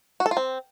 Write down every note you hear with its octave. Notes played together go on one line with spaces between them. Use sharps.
F#4
A4
F4
C4